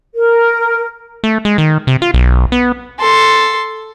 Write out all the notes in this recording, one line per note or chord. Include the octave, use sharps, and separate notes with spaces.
A#4
A3
G#3
D#3
C3
F4
B1
B3
A4 C6